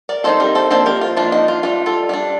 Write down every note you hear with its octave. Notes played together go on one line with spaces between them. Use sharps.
A#4 D5
D#3 G3 C4 D#4 A4 C5
G4 A#4
A4 C5
F3 A#3 D4 A4 C5
G4 A#4
F4
F3 A#3 D4 F4
D#4
F4
G3 D4 F4
F4 A4
G3 D4